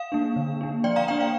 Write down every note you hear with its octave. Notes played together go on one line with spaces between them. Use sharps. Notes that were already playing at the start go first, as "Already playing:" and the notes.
Already playing: F5
A#3 D4
D3
A#3 D4
F3 D5 G5
F5 A#5
A#3 D4 D5 G5
F5